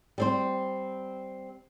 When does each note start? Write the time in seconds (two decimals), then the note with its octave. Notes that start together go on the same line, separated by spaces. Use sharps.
0.18 G3 C4 C5